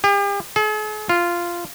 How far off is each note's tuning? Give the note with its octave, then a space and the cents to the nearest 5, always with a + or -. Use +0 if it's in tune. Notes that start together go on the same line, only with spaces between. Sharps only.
G4 +40
G#4 +45
F4 -10